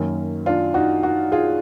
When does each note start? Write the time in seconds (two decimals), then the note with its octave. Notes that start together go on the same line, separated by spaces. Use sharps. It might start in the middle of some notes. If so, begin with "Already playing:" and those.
Already playing: F#2 D#3 F#3 A#3
0.46 D4 F4
0.74 D#4 F#4
1.03 D#4 F#4
1.32 F4 G#4